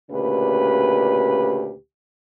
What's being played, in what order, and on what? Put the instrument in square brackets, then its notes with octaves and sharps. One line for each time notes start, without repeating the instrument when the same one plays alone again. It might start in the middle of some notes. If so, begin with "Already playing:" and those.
[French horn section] D2 A#2 C#3 G4 B4